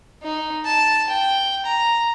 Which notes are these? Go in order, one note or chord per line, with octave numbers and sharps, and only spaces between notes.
D#4
A5
G5
A#5